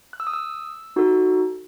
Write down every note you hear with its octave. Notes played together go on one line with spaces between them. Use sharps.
F#6
E6
D#6
E6
D#4 F#4 A4